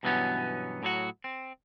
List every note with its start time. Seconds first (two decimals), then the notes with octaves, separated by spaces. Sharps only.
0.03 G2 B2 E3 F#3 B3 C#4
0.83 A2 F#3 F#4
1.24 C4